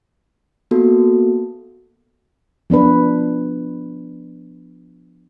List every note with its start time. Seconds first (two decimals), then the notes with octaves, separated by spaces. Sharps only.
0.71 A#3 B3 F#4 A4
2.70 F3 B3 D4 B4